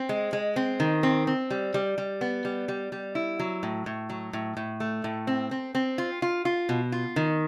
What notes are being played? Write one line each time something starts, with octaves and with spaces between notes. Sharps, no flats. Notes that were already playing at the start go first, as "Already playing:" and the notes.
Already playing: C4
G#3
G#3
C4
D#3
C4
C4
G3
G3
G3
B3
G3
G3
G3
E4
F#3
A2
A2
F#3
A2
A2
A3
A2
C4
C4
C4
F4
F4
F4
B2
F4
D#3